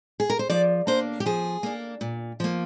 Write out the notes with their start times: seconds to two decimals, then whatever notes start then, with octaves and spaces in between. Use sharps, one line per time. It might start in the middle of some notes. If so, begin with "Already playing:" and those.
0.20 G#4
0.30 A#4
0.39 C5
0.50 F3 D5
0.87 A#3 D4 C5
1.20 G4
1.26 F3 G#4
1.63 A#3 D4
2.01 A#2
2.40 F3 A#3